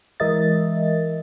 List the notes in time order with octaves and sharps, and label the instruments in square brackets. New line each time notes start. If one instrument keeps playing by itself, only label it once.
[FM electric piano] E3 G#3 A#4 D#5 E5 A6